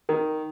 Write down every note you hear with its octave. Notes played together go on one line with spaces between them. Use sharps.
D#3